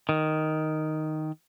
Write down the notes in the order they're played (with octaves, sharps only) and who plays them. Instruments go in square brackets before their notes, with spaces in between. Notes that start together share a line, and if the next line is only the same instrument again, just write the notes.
[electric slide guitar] D#3